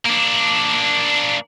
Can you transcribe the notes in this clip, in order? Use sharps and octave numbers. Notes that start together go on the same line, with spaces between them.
A#3 D4